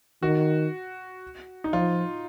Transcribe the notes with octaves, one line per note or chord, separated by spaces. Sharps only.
D#3 F#4
D#4
F3 F4